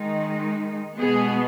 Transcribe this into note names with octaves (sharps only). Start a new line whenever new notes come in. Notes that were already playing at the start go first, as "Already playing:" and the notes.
Already playing: D#3 G#3 D#4
B2 G#3 B3 G#4